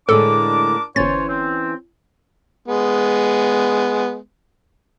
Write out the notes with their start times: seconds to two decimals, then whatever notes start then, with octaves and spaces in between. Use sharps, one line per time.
0.09 A2 D3 G#3 D4 A4 A#4 D6
0.96 G1 E3 C#4 C5 C#5 A6
1.29 C4
2.68 G#3 B3